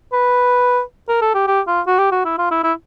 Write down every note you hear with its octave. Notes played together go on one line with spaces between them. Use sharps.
B4
A#4
A4
G4
G4
F4
F#4
G4
F#4
E4
F4
E4
E4